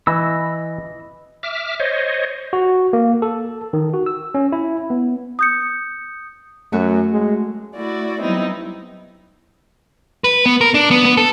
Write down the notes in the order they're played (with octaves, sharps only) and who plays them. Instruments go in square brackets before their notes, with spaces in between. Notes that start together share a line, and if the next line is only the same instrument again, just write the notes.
[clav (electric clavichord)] E3 [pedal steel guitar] D#5 B5 E6
[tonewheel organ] E5 D6 F6
C5 C#5 D#5
[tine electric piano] F#4
A#3
A4
D#3
F#4
E6
C#4
E4
B3
[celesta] D#6 G6 C#7
[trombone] F#2 [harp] A3 F#4
[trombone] G#3
[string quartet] A3 E4 F#4 D5
F#3 G3 B3 C4 D#4 E4
[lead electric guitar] B4
B3
A#4
D4
B3
B3
A4